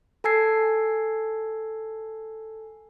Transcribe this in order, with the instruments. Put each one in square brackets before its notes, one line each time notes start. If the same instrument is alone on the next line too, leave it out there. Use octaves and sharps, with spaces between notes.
[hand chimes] A4 G#5 A5 E6 G#6 C7